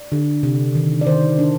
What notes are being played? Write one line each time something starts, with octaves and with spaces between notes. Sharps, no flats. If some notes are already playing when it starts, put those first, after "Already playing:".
Already playing: D5
D3
C3
D#3
D5
D#3 C5
D4